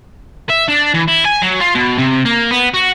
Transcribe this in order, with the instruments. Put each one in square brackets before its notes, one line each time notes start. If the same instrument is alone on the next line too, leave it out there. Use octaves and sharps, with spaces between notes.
[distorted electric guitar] E5
D4
E3
E4
G#5
F#3
F4
B2
C3
A#3
B3
F#4